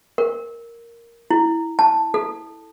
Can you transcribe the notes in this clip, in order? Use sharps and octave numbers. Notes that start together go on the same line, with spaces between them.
A#4
E4
A5
A4